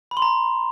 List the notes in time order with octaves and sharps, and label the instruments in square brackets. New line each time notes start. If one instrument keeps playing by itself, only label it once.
[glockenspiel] B5
C6
A#5